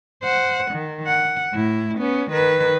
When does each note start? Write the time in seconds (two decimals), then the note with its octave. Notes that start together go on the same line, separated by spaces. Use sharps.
0.24 C5 F#5
0.71 D#3
1.07 F#5
1.53 A2 E4
1.98 B3 C#4
2.31 D#3 B4